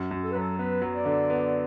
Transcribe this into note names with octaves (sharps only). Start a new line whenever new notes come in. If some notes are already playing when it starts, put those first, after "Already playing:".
Already playing: F#2
F#2
A4
B4
F#3 A4
B3 B4
F#3
D5
D3
B3